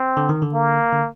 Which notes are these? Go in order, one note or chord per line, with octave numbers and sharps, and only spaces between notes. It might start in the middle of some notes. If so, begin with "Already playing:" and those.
Already playing: C4
D3
D#3
D3
A#3
D3